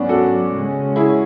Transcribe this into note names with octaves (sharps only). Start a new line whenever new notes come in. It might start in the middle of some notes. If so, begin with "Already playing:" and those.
Already playing: G#2 F#3 B3 C#4 D4
F#4 A4
C#3 G#3 C#4
E4 G#4